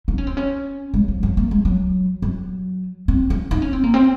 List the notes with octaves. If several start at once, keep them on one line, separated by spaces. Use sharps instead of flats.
D#4
C#4
C4
C#4
G#3
F3
F#3
A#3
G#3
F#3
F#3
C4
C#4
D#4
C#4
C4
A#3
C4